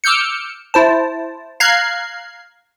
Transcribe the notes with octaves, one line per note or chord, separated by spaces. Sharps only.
D6 E6 F6 G6 C#7
E4 C5 A5
F5 A#5 F#6 G#6 C7